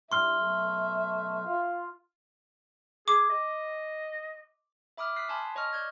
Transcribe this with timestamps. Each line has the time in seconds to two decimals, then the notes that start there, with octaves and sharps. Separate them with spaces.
0.12 G2 G3 E4 E5 C6 F6
0.41 B2 F#3 A3
1.47 F4
3.08 G#4 D6
3.30 D#5
4.97 E5 B5 D6 D#6 F6
5.16 D#6 F#6 B6 C7
5.29 G#5 A5 B5 C6 D#6
5.55 C#5 D#5 C#6 D#6 F6
5.73 D5 G6 G#6